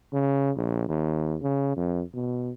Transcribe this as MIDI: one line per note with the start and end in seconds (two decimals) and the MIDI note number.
0.13 0.51 49
0.57 0.87 34
0.89 1.37 39
1.42 1.76 49
1.77 2.03 41
2.14 2.52 47